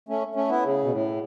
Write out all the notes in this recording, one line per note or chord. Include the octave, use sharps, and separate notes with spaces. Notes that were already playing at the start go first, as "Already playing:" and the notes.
A3 C#4
A3 C#4
B3 E4
C#3
B2
A2